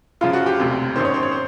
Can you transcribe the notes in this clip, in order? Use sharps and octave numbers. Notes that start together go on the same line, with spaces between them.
F#2 C#3 F3 F4
F#4
G4
E1 D2 C3
G#1 F#2 D#3 C5
C#5
C5
C#5
C5